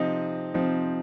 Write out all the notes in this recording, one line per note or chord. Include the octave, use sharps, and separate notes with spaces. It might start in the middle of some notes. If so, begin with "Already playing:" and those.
Already playing: C3 F3 C4 D#4 D#5
C3 F3 C4 D#4